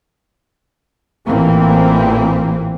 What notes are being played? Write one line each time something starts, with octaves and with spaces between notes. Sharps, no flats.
A1 A#2 E3 A#3 C4